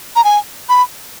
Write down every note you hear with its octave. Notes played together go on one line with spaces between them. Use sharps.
A#5
G#5
B5